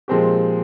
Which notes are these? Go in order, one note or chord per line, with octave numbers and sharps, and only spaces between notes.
A#2 F3 G#3 C4 G4